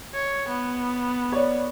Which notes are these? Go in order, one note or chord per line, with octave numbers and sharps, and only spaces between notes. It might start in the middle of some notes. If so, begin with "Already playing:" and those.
C#5
B3
C#5 D5